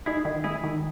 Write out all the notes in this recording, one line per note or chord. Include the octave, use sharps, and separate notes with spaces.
D#4 E4 G#4
D#3
G#3 E4 G#4
D#3